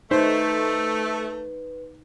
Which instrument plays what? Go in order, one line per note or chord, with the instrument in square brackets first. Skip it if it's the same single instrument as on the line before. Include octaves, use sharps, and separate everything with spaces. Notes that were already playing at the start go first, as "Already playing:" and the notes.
[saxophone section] A3 [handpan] D#4 [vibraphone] B4 [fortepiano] C5